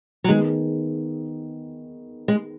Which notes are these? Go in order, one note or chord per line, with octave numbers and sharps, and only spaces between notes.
F#3
D#3 G#3 B3 G#4
G#3